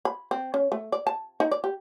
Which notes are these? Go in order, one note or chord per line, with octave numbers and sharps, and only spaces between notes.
B5
C4
C#4
A3
D5
A5
D#4
D5
G4